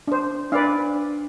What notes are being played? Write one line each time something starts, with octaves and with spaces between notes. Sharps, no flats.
D4 C5
D4 B4 D5 F5